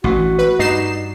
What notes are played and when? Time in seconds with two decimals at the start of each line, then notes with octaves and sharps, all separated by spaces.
0.04 A1 E3 F#4
0.38 B4
0.59 G2 D#4 C7 E7